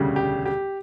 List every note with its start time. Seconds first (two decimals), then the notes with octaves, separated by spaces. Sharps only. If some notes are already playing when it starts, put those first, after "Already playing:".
Already playing: E1 D2 C#3 G3
0.16 G4
0.46 G4